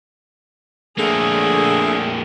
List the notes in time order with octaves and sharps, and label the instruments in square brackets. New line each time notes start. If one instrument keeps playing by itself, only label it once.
[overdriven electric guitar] F2 A#3 [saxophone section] D3 A3 [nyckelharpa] G#4